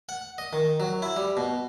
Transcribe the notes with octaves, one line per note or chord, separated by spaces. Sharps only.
F#5
D#5
D#3
F#3
E4
G3
B2